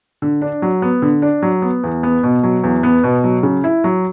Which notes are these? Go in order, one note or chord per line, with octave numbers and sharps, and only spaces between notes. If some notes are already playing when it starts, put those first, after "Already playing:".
D3
D4
F#3
B3
D3
D4
F#3
B3
E2
B3
B2
F#3
E2
B3
B2
F#3
C#3
E4
F#3